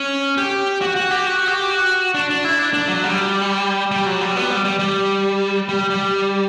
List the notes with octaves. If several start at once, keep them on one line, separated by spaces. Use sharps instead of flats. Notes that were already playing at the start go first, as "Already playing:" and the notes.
Already playing: C#4
G4
F#4
F#4
G4
F#4
G4
F#4
D4
D4
E4
D4
D4
F#3
G3
G3
F#3
G3
B3
G3
G3
G3
G3
G3